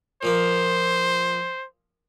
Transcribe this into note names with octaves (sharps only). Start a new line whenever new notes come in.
A#2 F3 A#3 C5